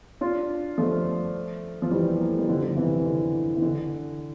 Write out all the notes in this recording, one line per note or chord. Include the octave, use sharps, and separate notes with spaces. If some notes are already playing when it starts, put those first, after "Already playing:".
D4 F4
F3 A3
F3
E3 G3
A#3
A3
G3
D3 F3
D3
C3 E3
D3
E3
D3